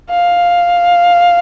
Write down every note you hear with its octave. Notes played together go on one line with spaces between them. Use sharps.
F5